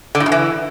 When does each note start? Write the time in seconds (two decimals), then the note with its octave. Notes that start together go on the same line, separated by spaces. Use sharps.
0.15 D3
0.20 A2
0.26 F#2
0.32 E3